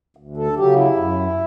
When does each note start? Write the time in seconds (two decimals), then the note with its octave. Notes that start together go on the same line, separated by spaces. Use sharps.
0.17 D2
0.37 A4
0.56 C#3 F#3 G4
0.76 E4
0.96 F#2